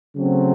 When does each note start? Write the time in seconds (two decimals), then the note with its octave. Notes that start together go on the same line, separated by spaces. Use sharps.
0.15 C#3 F#3 A3 C4